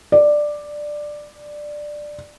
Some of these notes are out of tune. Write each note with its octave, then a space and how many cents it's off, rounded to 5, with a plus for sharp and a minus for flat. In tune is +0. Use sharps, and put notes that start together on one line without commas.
D5 +10